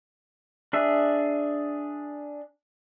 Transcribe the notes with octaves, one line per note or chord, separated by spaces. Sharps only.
D4 G#4 E5